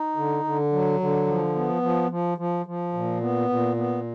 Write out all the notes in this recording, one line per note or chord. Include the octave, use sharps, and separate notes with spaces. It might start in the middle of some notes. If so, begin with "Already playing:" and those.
Already playing: D#4
D3
D3
F#3
D3
F3
B3
F3
F3
F3
F3
A#2
B3
A#2
B3